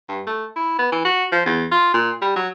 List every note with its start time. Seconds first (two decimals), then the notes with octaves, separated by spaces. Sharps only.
0.09 G2
0.27 A3
0.56 E4
0.79 B3
0.92 E3
1.05 F#4
1.32 F3
1.46 E2
1.72 F4
1.94 A#2
2.22 G3
2.36 F#3